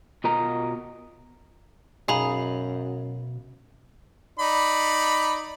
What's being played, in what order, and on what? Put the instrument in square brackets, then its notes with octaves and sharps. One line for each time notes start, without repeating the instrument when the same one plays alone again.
[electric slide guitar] B2 F4 A#4 D#5 A#5
[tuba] F#2 [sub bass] B2 [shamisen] D#4 G#4 [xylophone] F5 A#5 B5
[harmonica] D#4 D5 B5